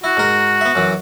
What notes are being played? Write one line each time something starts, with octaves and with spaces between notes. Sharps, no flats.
E4 F#4
G#2 A#4
B3 E5
F#2 E3